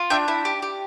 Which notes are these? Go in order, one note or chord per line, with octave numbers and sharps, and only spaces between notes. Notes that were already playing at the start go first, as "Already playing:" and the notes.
Already playing: F4
D4 E5 G5
E4
G4
G4